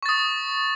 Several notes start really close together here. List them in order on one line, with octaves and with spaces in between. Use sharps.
C#6 A6 D#6